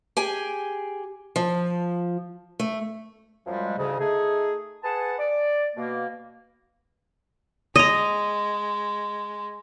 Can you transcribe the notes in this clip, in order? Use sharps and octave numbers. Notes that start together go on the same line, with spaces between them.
G4 G#4 G#5
F3
A3
F#2 F3 G3 G#3
D2 G#2 C#3
A3 D#4 G#4
G#4 B4 F#5 A5
D5
B2 A#3
G#3 D#5 A#5